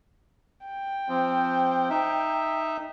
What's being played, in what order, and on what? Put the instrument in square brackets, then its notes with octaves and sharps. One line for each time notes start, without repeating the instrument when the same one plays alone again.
[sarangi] G5
[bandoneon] F3 C4
D#4 E5